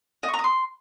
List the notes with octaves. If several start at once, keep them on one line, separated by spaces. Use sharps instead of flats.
D#5
C#6
A#5
D#6
C6